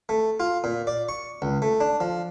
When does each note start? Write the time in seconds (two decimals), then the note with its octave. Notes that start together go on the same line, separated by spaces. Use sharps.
0.09 A3
0.40 F4
0.64 A#2
0.87 D5
1.09 C#6
1.42 C#2
1.62 A3
1.81 D4
2.00 F3